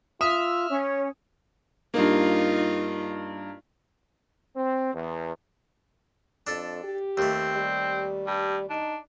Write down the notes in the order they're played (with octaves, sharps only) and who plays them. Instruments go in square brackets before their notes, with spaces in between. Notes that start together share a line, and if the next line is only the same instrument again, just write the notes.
[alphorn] F4 [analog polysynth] E5 F6 [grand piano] D#6
[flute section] C#4 [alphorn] C#5
[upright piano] G2 A#3 [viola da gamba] D#4 F4
[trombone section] C4
E2
[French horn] F2 [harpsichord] D4 A4
[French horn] G4
[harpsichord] D#2 A3 [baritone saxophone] C4
[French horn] G3
[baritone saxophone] G2
[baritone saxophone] D4 [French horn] D#4